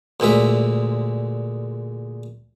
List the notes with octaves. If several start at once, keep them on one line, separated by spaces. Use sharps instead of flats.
D2 A#2 G#3 E5